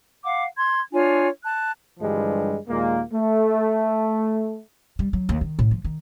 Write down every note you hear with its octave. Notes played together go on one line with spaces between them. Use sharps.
F5 F#5 D6
C6 G#6
D4 F4 C#5 G#5
A5 F#6
G2 D3 E3 F3 G3 G#3
D#2 A#2 G#3 A#3
A3
G3
F#3
D#2
D#3
A2
F3
D#3